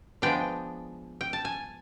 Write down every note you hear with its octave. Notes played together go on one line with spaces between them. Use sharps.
F3 G#3 B3 D4 G5
G5
A5
G#5